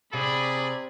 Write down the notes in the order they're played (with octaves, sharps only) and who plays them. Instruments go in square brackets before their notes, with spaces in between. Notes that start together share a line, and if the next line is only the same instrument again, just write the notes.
[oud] C3 [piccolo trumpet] G#4 [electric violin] D5 B5